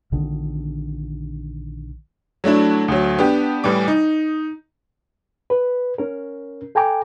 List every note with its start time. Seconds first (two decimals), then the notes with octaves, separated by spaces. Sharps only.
0.12 A#1 D3 D#3
2.44 F#3 A3 D4 E4
2.88 D2 F#3
3.19 B3 D4 G4
3.64 A2 E3 G3 D6
3.88 D#4
5.50 B4
5.98 C#4 A#4
6.75 A4 G5 G#5 A#5 D6